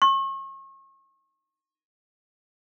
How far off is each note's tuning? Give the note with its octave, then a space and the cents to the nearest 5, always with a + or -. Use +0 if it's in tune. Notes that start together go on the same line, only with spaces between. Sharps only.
C#6 -35